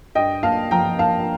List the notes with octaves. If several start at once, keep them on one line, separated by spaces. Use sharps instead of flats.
G2 D#5 G5
A#3 F5 A5
F3 G5 A#5
A#3 F5 A5